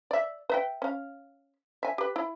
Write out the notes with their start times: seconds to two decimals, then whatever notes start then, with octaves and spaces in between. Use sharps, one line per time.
0.11 D5 E5
0.50 B4 E5 G5
0.82 C#4 F5
1.83 E5 G#5
1.98 G4 B4
2.16 E4